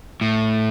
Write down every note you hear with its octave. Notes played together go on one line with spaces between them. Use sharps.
A2